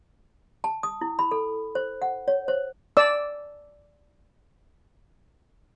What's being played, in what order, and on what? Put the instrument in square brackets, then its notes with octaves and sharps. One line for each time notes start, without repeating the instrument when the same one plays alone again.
[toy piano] A5
D#6
E4
B5
A4
C5
F#5
C#5
C5
[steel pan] D5 E6